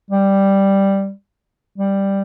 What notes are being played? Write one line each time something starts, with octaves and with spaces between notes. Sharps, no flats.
G3
G3